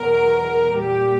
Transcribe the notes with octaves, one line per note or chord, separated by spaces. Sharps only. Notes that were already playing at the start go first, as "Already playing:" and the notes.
Already playing: E2 B2 F#3 A#4
A#2 G3 G4